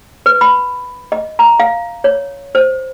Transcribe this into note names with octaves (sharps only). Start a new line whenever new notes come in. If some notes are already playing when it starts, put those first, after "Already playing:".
B4
B5
D#5
A#5
F5
C#5
C5